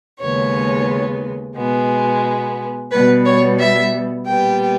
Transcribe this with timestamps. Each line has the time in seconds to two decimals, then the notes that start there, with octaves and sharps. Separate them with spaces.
0.21 D#2 C#3 G#3 B3 C#5
1.56 B2 G#3 B3
2.91 B2 G3 B3 B4
3.26 C#5
3.59 E5
4.27 A#2 G3 B3 G5